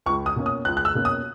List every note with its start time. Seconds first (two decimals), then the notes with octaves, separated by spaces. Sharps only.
0.06 C#2 C#6
0.26 D#6
0.36 B2 A#3 C#4
0.46 D#6
0.65 C#2 F#6
0.77 F#6
0.85 E6
0.95 B2 A#3 C#4
1.05 D#6